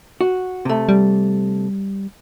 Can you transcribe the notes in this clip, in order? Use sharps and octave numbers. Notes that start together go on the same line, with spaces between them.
F#4
C3 A3
G3